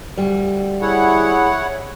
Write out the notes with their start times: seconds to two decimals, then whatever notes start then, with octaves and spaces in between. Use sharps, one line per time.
0.17 D2 G3
0.82 E4 G#4 C#5 F#5